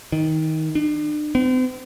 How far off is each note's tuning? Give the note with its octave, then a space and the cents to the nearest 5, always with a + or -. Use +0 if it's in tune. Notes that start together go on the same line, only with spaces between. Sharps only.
D#3 +20
D4 +40
C4 -40